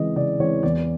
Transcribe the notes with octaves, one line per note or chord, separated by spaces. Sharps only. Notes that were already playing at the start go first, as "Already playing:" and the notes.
Already playing: C#3 E3 G#3 C4 D#5
C#3 D5
E3 G#3 C4 C#5
E2 D5